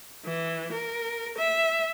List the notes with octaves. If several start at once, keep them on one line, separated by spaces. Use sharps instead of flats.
E3
A#4
E5